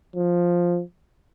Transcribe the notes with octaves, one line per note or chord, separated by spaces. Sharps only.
F3